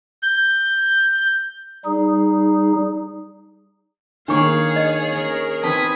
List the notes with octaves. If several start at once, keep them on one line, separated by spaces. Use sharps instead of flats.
G6
G3 D#4 G#4
D#3 A#3 D4 G#4 C#5 F5 C#6
D#5
C#4 A#4
C4 D#4 B4 G#5 A5 D#6 B6